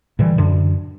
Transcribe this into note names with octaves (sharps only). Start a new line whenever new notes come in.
A2 D3 E3 G3
F#2 D3